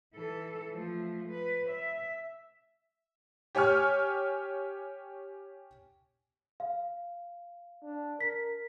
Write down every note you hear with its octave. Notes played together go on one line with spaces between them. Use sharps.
E3 A4
F3 A3
B4
E5
G4 C#5 G#5 C#6 F6
F5
D4
A#4 B6